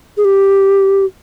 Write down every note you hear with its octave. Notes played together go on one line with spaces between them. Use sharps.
G#4
G4